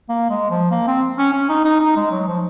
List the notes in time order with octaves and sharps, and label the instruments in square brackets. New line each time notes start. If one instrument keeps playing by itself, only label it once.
[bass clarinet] A#3
G#3
F3
A#3
C4
C#4
C#4
D#4
D#4
D#4
G#3
F#3
F3